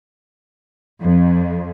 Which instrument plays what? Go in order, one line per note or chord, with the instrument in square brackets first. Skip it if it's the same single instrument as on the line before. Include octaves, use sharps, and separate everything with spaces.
[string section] F2